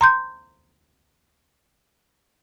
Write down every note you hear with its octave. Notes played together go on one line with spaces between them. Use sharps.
A#5 C6 G6